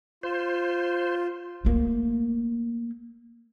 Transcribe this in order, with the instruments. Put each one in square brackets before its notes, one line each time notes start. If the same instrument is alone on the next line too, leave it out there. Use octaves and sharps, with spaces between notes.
[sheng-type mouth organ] F4 [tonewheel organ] C5
[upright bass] A3 A#3